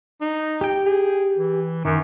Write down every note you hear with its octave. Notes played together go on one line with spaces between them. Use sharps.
D#4
G4 G5
G#4
E3
F#2 D#3